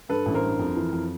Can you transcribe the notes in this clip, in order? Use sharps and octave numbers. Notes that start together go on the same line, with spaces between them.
G2 A4 B4
A1
A#4 C5
G2
F2
E3
F2